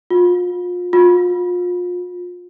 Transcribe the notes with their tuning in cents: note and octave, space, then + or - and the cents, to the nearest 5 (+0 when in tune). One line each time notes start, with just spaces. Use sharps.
F4 +30
F4 +30